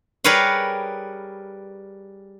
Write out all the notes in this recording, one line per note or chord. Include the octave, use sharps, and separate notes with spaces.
G3 G#4 A#4 B4 C#5 F5